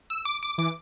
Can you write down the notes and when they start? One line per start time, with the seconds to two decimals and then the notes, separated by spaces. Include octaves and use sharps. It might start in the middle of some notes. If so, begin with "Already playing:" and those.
0.10 E6
0.25 D6
0.43 D6
0.58 E3 D6